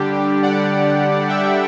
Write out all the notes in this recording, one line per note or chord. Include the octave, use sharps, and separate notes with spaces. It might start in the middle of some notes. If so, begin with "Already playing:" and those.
Already playing: D3 G3 D4 G4
G4
D5 F#5
E5 G5